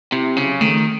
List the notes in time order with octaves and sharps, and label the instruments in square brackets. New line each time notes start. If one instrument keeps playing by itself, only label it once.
[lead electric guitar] C3 [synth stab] E4
[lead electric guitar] C#3 [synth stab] F#3
[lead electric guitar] D#3 [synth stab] A3